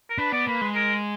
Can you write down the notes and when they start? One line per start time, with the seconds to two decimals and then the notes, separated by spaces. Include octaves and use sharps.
0.10 A#4
0.18 D4 B4
0.32 B3 D5
0.47 A#3 B4
0.61 G#3
0.75 A#4